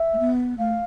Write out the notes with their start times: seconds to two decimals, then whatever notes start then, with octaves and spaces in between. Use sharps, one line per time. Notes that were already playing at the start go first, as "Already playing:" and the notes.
Already playing: E5
0.13 A3
0.19 B3
0.58 A3 F5